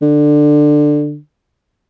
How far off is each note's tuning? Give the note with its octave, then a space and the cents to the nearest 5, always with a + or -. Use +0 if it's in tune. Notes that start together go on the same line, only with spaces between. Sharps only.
D3 +15